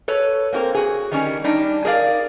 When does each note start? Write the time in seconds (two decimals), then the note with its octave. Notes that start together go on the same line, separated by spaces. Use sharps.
0.08 A4 B4 C#5
0.53 A#3 C4 F#4 A#4
0.74 F#4 G#4
1.11 D#3 G3 C#4
1.44 G3 D4 D#4
1.85 G#4 A#4 D5 F5